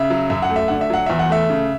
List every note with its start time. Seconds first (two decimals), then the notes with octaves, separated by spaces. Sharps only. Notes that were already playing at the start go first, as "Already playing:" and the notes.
Already playing: C#3 E5
0.10 F#3
0.30 F#2 E5
0.42 F#5
0.50 A3
0.56 E5
0.68 D3 F#5
0.81 E5
0.90 F#3 F#5
1.06 E2 E5
1.19 F#5
1.29 A3 E5
1.50 C#3